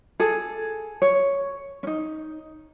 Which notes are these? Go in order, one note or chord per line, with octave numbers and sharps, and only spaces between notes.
G#4 A4
C#5
C#4 D#4